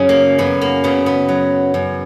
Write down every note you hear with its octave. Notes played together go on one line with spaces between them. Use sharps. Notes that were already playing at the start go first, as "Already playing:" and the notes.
Already playing: F#2 C#3 C#4
A#3
F#2 B3
A#3
C#3 B3
B3
F#3
F#2